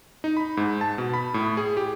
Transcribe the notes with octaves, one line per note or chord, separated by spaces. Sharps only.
D#4
B5
G#2
A5
B2
B5
A2
G#4
G4